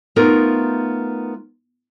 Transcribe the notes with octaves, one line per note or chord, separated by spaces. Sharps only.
A3 B3 D#4 F4 A#4